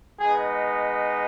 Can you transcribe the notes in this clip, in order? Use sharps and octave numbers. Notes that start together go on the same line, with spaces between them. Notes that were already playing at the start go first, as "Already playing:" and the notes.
G#3 B3 D#4 G#4